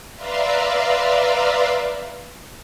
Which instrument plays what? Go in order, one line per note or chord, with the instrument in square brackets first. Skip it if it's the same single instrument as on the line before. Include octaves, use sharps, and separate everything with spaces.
[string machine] B4 D5 E5 F5 A#5 C6